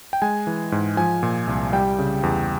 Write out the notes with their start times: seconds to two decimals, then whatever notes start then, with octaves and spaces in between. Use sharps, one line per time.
0.13 G5
0.22 G#3 G#5
0.47 E3
0.72 G#2
0.97 F3 G#5
1.23 A#2
1.47 C2
1.73 G3 G5
1.99 C#3
2.23 E2